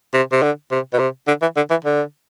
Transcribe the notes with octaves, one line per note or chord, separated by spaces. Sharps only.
C3
C3
D3
C3
B2
C3
D3
E3
D3
E3
D3